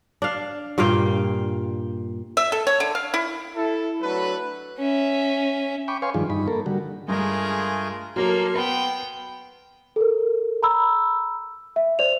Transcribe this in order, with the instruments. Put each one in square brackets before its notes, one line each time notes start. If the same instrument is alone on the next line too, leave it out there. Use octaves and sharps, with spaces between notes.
[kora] D4 F5
G2 A#2 F5 G5
[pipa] E5
A4
C#5
D3
F5
E4
[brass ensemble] E4 A4
F#3 A3 D4 A4 B4
[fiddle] C#4 E5
[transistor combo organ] G5 B5 C#6 D6
B4 C#5 F5 G#5 C6 C#6
G2 D#3 F3 D4 F4 G#4
G2 D#4 B5
A#3 A4 A#4
D3 G3 F#4
[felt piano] G2 [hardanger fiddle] G#3 A#4 [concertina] A3 F4 G#4
[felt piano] F#3 A#4 [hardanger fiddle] A#3 A4 [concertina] C6 F6
[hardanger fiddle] B3 G5 [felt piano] B5
[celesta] A4 A#4
A#5 B5 E6
E5
C5 D5 F7